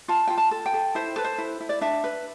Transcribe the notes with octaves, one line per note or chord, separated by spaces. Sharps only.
F4 A5
F4 G5
A5
A4
G5
A4
E4 C5
A4 B4
C5
E4
E4
D5
D4 E5
B4